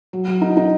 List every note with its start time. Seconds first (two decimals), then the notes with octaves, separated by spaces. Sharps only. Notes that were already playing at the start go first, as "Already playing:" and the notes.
0.13 F#3
0.28 F#3
0.41 D#4
0.57 D#4